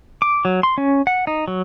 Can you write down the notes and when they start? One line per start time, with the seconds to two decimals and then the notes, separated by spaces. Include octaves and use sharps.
0.22 D6
0.45 F#3
0.63 C6
0.78 C#4
1.07 F#5
1.27 D#4
1.48 F#3